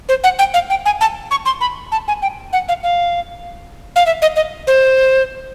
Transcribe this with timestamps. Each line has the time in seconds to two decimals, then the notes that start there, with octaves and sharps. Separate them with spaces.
0.09 C5
0.24 F#5
0.39 G5
0.54 F5
0.70 G5
0.86 G#5
1.01 A5
1.31 C#6
1.46 C6
1.61 B5
1.92 A5
2.08 G#5
2.22 G5
2.53 F#5
2.68 F5
2.83 F5
3.96 F5
4.06 E5
4.22 D#5
4.36 D#5
4.67 C5